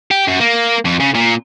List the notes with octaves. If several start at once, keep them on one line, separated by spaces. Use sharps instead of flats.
G4
F#2
A#3
F2
C#3
A#2